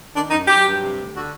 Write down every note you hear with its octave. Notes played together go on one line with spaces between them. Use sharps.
D#3 D4
F#2 D#4
F#3 G4
G2
C3
D2
D3 F#4